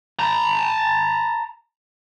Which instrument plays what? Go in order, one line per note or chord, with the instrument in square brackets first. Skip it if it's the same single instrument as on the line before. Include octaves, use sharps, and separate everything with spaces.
[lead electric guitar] A5 A#5